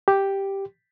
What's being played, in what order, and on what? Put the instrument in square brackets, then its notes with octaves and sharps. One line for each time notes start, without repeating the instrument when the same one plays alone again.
[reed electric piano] G4